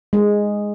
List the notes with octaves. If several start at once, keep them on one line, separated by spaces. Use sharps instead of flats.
G#3